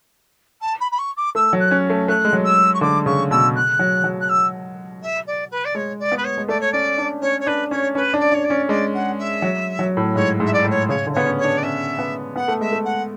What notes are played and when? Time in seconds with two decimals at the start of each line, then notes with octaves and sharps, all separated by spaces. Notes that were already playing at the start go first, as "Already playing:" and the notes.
0.61 A5
0.80 B5
0.91 B5
0.98 C#6
1.16 D6
1.35 A3 E6
1.53 F#3
1.59 F#6
1.71 C#4
1.90 A3
2.08 A3 F#6
2.25 G#3
2.33 F#3
2.44 E6
2.74 C#6
2.81 D3 D6
3.06 C#3 C#6
3.31 B2 E6
3.55 F#6
3.79 F#3
4.04 F#3
4.20 F#6
4.29 E6
5.02 E5
5.27 D5
5.51 B4
5.64 D5
5.75 G#3 C#5
5.99 D5
6.12 B3 B4
6.24 C#5
6.38 G#3
6.48 A3 D5
6.60 C#5
6.72 C#4 D5
6.98 D4
7.21 C#4 C#5
7.40 C#5
7.46 D4 B4
7.70 C#4 C#5
7.95 C#4 B4
8.14 D4
8.19 D5
8.32 D4 C#5
8.44 D5
8.50 C#4
8.68 G#3 D5
8.94 F#5
9.18 E5
9.42 F#3
9.79 F#3
9.97 A2
10.15 G#2 C#5
10.40 G#2
10.45 E5
10.53 D5
10.64 A2
10.70 C#5
10.88 C#3 C#5
11.07 D3
11.13 B3 C#5
11.26 C#4
11.38 C#5
11.44 D4
11.57 D5
11.63 C#4 E5
11.99 B3
12.36 B3 F#5
12.48 A3
12.60 G#3 E5
12.72 A3
12.85 F#5